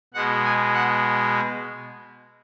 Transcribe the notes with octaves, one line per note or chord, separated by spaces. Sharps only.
B2 G#3 F#5
G#5
F#5